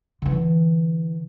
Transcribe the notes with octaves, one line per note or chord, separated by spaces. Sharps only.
D3 E3